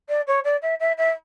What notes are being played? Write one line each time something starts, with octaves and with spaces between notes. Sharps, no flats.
D5
C#5
D5
E5
E5
E5